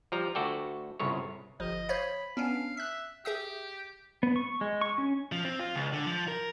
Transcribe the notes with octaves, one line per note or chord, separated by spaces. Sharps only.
F3 G3 A#5
D2 F#4 A4 D5 G5
G1 C2 C#3 C#5
G1 F3 D#5
C5 C#5 F5 B5
B3 C#4 D4 F5
E5 F#6 B6
G4 G#4 E5 D#6
B3
C#6
G#3
C#6
C#4
F3
C4
F4
C#2
D3
F3
A#4